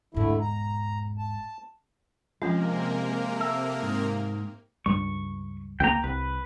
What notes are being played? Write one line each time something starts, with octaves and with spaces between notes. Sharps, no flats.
E1 G#2 D3 A3 E4
A#5
A5
C3 F3 G#3 A#3 C#4 F4 A#4
A4 E5
G#2
C#2 G2 G3 C#6
C#2 A3 A#3 G5 A#5
C2 B4